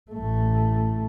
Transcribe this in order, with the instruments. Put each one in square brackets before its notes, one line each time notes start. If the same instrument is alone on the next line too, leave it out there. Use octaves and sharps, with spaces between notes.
[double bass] A1 A3